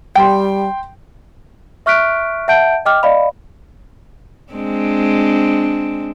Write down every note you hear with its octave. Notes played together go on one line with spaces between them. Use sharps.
G3 G5 C6
E5 C#6 F6 F#6 B6 D7
E5 F#5 A5 G6 D7
D#5 G5 D6 F6
D5 D#5 F5 B5
G#3 C4 D4